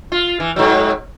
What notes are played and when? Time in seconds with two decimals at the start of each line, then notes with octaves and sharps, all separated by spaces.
0.12 F4
0.40 E3
0.56 G#2 B2 F#3